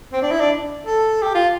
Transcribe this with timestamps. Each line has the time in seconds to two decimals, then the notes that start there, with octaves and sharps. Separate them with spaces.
0.13 C4
0.22 D4
0.31 E4
0.40 D4
0.86 A4
1.22 G4
1.34 F4